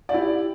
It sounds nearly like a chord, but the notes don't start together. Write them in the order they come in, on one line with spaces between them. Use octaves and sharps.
D5 G4 E4